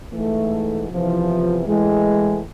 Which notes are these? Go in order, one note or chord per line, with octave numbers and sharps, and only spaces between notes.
G#2 E3 A3
E2 C3 E3 F3
A2 E3 G#3